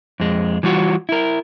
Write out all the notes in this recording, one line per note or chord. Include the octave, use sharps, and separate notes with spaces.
F2 G#3
E3 G3 F4 F#4
E4 A#4